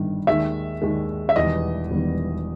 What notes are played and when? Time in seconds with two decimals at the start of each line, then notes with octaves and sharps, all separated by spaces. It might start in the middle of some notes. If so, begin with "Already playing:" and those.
Already playing: G1 G2 D#3
0.27 D#2 D#3 G#3 E5
0.82 D#2 D#3 G#3
1.29 E5
1.36 E1 E2 D#3 G3 B3 D#5
1.91 E1 E2 D#3 G3 B3